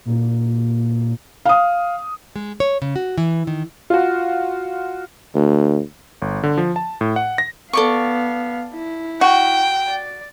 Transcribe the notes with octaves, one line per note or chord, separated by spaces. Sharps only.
A#2
F5 D#6
G#3
C#5
C#3
F#4
E3
D#3
F4 F#4
D2
G1
D3
F3
A5
A2
F#5
A#6
B3 A4 D5 F5 C#6
E4
F#4 G5
D5